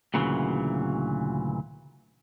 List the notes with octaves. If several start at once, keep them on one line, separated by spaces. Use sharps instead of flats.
D2 A#2 C#3 E3 F#3